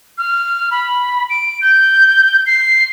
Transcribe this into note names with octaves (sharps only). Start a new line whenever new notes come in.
F6
B5
D7
G6
C7